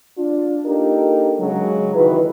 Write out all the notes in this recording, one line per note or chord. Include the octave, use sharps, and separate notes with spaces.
D4 F4
A#3 D4 D#4 G4 A4 A#4
C#3 F#3 G#3
F2 D#3 E3 F#4 B4